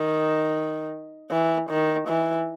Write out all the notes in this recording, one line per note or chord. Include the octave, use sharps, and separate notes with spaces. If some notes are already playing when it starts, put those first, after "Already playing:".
Already playing: D#3
E3
D#3
E3